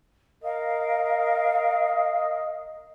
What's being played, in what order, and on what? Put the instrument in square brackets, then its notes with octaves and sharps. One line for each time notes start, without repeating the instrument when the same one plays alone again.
[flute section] A#4 F5 [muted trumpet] D#5